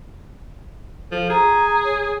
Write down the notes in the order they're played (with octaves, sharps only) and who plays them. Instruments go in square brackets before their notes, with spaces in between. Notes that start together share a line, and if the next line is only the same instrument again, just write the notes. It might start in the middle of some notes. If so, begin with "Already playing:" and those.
[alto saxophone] F3 [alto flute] A4
[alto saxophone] G#4 [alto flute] A#5
[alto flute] C#5